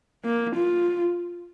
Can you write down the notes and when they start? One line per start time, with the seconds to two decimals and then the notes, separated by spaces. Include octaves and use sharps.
0.25 A#3
0.56 F4